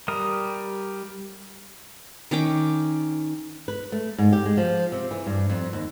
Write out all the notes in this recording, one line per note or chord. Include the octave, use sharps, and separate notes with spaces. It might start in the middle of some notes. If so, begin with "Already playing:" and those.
G3 A#4 D#6
D#3 C#4 G5 D6
B4
A3
G#2
G4
G#3
F3
C3
E3
G2
F2
D#2